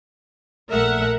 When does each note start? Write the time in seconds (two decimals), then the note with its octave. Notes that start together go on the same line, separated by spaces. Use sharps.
0.70 A#1 A3 A#4 E5 F#5